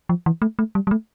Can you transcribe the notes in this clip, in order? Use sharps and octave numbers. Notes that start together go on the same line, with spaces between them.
F3
E3
A3
A3
G3
G3
A3